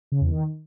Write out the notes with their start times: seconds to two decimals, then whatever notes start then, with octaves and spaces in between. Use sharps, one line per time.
0.12 C#3
0.21 E2
0.31 D#3